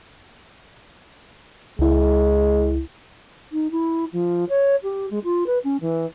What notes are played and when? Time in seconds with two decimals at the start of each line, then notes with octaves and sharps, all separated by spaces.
1.79 C#2 G#3 E4
3.52 D#4
3.71 E4
4.12 F3
4.49 C#5
4.83 G4
5.10 G#3
5.24 F4
5.46 B4
5.64 C#4
5.80 E3